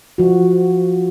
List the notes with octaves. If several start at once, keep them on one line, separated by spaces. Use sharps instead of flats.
F3 F#4